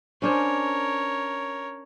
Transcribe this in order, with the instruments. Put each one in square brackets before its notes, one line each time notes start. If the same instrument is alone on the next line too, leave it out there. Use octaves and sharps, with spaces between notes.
[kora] C#4 D4 C5 [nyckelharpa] A#4 C#5